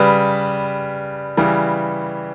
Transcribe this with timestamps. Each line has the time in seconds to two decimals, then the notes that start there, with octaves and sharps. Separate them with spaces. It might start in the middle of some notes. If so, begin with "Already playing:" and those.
Already playing: C#3 G3 B4
1.37 C#3 E3 G3